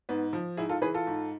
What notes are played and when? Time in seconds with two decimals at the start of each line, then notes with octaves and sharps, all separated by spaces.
0.09 G#2 B3
0.33 F3
0.57 G#2 E4 G#4
0.69 F4 A4
0.82 E3 G#4 B4
0.94 F4 A4
1.07 G#2